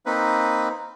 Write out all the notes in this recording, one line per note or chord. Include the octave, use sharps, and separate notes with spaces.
A#3 C4 D#4 B4